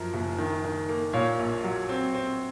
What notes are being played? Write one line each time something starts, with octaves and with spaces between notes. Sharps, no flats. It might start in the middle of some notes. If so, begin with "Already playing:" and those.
Already playing: F#2 F3 A#4
F#1
D#3
D#3
A#3
A#2 C#5 F5
A#1
F#3
C4
C4